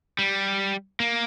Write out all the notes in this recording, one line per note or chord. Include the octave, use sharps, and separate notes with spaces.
G3
A#3